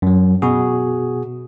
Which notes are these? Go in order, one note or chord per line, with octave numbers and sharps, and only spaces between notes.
F#2 F#3
B2 F#4 G#4